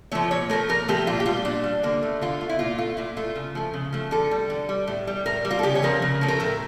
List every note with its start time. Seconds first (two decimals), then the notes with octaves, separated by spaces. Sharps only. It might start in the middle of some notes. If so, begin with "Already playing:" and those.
0.12 F3 A3 C#5
0.31 A#2 C#5
0.50 F3 A3 A#4
0.69 A#2 A#4
0.88 F3 A3 G4
1.07 A#2 F4
1.20 G4
1.26 G3 F4
1.45 A#2 D4
1.64 G3
1.83 D3 A#3
2.03 A3
2.21 D3 F4
2.41 A3
2.49 E4
2.59 A#2 F4
2.78 A3 F4
2.97 A#2 E4
3.17 A3 F4
3.36 C#3
3.55 F3 A3
3.74 C#3
3.93 F3 A3
4.11 D3 A4
4.31 G3
4.50 D3
4.69 G3
4.87 A2
5.07 G3
5.26 A2 A#4
5.45 G3
5.51 F4
5.59 A4
5.63 C#3 G4
5.75 C#5
5.82 F3 A3 A#4
6.02 C#3
6.21 F3 A3
6.28 A#4
6.40 A2 A4